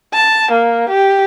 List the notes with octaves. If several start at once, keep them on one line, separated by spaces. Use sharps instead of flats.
A5
A#3
G4